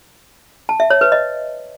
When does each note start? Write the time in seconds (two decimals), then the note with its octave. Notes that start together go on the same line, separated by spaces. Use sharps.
0.69 A5
0.80 E5
0.90 C#5
1.01 B4
1.12 D#5